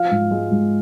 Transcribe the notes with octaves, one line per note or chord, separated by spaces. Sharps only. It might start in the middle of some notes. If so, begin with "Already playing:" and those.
Already playing: F3 F5
G#2
G#3
G#2